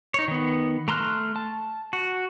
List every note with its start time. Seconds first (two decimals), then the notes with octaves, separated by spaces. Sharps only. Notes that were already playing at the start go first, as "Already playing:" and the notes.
0.14 D#4 C#5
0.28 D#3 B3
0.88 A3 A#5 C6 F6 F#6
1.36 A5
1.93 F#4